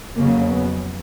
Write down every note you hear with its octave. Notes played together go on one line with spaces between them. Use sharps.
F2 C#3 F#3 A#3
B3